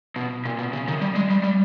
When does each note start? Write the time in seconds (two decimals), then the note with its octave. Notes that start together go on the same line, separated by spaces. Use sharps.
0.16 B2
0.45 A#2
0.59 B2
0.73 C#3
0.88 D#3
1.01 G3
1.15 G#3
1.30 G3
1.44 G3